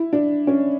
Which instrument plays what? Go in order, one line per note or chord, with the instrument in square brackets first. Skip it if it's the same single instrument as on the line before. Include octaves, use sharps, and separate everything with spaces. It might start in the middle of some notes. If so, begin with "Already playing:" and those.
Already playing: [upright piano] E4
D4
C#4